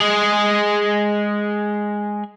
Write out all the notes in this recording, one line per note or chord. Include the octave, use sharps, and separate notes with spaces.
G#3 G#4